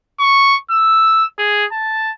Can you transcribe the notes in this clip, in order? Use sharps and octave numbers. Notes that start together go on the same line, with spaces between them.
C#6
E6
G#4
A5